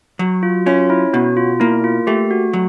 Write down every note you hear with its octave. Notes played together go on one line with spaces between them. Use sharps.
F#3 F#4
F4
C#4 F4
E4
B2 F#4
F4
A#3 E4
F4
A3 G4
F#4
F#3